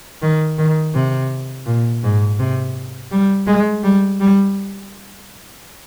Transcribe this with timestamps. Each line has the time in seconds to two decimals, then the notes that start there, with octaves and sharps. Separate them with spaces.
0.22 D#3
0.58 D#3
0.94 C3
1.66 A#2
2.03 G#2
2.39 C3
3.11 G3
3.47 G#3
3.83 G3
4.20 G3